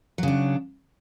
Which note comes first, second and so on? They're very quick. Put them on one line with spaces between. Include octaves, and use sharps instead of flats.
F#3 C#3 D4